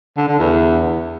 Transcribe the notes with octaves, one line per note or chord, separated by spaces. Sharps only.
D3
D3
E2